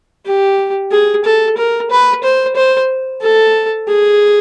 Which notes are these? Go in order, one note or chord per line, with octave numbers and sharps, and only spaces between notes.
G4
G#4
A4
A#4
B4
C5
C5
A4
G#4